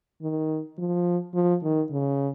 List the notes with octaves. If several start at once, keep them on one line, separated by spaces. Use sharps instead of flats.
D#3
F3
F3
D#3
C#3